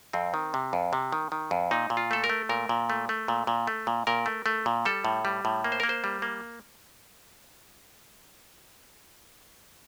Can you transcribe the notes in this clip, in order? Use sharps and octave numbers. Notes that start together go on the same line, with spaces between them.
F2 C4
D#3
C3
F2
C3
D#3
D#3
F2
A#2 D#4
A#2
F4
A3 A4
A#4
A3
A#2 A#4
A#2
A3
A3
A#2
A#2
A3
A#2
A#2 A#4
A3
A3
A#2
G3 A4
A2
G3
A2
A#3
C5
A#4
A#3
C5
G3
A#3